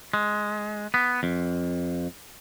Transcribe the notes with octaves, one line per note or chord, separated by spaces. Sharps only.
G#3
B3
F2